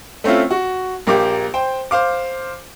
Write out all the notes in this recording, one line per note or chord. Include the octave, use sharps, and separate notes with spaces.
A3 C4 C#4 E4 F4
F#4
A#1 A#3 G4 D6
C5 G5
C5 F5 D6